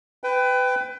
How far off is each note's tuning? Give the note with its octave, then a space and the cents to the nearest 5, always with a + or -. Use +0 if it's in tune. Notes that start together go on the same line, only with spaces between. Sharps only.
B4 +25 G5 +0